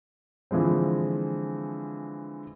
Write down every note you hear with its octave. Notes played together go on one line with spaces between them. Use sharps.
D3 E3 F3 G#3 C4